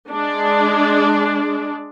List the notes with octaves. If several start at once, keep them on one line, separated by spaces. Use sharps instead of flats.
G#3 D4